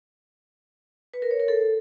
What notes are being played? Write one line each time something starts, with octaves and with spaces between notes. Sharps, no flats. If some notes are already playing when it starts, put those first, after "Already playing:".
B4
A#4
C#5
A#4
A4